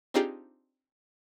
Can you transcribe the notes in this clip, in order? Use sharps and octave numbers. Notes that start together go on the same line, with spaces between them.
C4 D4 D#4 F4 G4 G#4